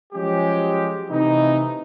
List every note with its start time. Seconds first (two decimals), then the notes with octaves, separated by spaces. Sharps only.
0.13 F3 F#3 G#3 C#4 G4
1.09 C3 E3 A3 D#4